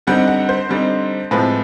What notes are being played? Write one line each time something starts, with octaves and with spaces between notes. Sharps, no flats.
D3 G3 C4 D#4 F#5
F#5
C5
D3 G3 C4 D#4
A2 F3 G#3 C4 B4